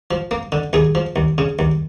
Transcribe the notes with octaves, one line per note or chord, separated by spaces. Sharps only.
F3
A#3
D3
D#2 G#4
F3
D#2
C#3
D#2